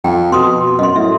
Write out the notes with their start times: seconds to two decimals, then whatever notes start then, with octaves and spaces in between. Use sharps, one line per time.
0.04 F2 G5
0.32 B2 C6 D#6
0.79 F#2 D#5 C6
0.96 A2 E5